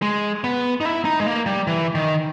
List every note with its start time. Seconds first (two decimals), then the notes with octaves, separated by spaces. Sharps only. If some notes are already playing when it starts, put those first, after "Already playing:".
0.02 G#3
0.44 B3
0.81 D#4
0.85 E4
1.05 D#4
1.20 G#3
1.27 A#3
1.46 G3
1.67 E3
1.95 D#3